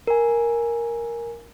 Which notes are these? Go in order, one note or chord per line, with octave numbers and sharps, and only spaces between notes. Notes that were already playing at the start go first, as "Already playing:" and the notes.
A#4 G#5